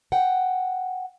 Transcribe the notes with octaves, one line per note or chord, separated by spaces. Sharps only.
F#5 G5